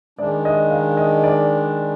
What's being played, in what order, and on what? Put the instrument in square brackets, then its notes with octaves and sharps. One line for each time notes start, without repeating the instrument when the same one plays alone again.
[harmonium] D#3 G#3 D4 [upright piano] D5
[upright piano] D#5
F5
D#5
D5